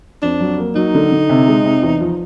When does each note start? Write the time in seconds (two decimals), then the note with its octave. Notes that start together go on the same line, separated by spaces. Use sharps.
0.23 F2 D4
0.40 F#3
0.58 A#3
0.75 F#3 D#4
0.94 D3
1.11 D3
1.29 C3
1.47 G#3
1.65 C3
1.83 E2
2.01 F3